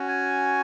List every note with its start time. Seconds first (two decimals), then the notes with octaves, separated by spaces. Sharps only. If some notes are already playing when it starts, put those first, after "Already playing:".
Already playing: C#4 F#4
0.08 G#5